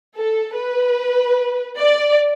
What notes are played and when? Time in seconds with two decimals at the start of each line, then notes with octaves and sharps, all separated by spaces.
0.16 A4
0.56 B4
1.78 D5